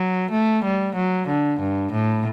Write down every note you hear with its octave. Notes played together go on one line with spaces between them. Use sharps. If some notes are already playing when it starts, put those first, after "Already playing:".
Already playing: F#3
A3
G3
F#3
D3
G2
A2